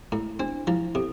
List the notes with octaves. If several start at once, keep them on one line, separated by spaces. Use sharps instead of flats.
A2 E4
C4 D4
F3 E4
C3 A4